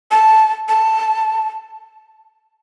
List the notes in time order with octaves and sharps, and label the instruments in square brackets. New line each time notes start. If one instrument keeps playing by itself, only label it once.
[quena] A5
A5